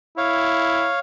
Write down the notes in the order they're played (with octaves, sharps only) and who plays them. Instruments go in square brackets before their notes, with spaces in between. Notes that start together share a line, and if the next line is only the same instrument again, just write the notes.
[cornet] E4 [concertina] C#5 F5